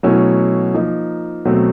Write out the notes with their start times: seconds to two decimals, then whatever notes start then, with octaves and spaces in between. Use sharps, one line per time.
0.03 B2 F#3 A3 C#4 E4
0.74 F3 A#3 D#4
1.45 B2 F#3 A3 C4